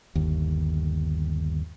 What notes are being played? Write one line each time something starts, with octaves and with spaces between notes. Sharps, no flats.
G1 D#2